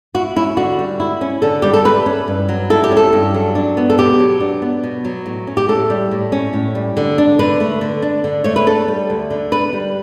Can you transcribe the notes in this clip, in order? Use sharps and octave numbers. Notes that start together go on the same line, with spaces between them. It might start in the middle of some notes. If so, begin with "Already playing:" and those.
E4 F#4
C#4 E4
D3 F#4
G3
E4
C#4
D3 A4
G3 G4
A4
E4 B4
C#4
G2
F#3
E4 A4
G4
C#4
A4
G2
F#3
D4
B3
A4
B2 G4
F#3
D4
B3
B2
F#3
A2
C#4
G4
A2 A4
G3
A2
C#4
A2
G3
D3
D4
D3 B4
A3
D3
D4
D3
A3 C#5
B4
D4 A4
G3
D2
D3
D4 B4
G3